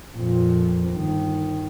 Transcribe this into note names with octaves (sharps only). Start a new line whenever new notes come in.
F2 A#2
G1 D#3